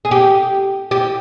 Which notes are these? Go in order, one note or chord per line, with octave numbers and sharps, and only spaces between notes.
G#4
G4
G4